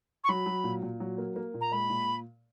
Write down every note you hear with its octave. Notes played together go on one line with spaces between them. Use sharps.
C#6
F#3 B5
F#3
A#2
A#2
F#3
A#3
A#3
A#2
A#5
G#3 B5
A#2